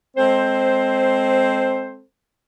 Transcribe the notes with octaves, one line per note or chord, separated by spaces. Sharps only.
G#3 C4 A4 C5